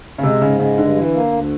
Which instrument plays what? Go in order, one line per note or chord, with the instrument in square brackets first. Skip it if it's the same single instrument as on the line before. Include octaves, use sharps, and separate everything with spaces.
[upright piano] C#3
[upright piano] C3 [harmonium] G#3
[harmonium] G#2 [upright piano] C#3
[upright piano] C#3 [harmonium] G#3
[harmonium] G2 [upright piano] D3
[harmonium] E3
A#3
D2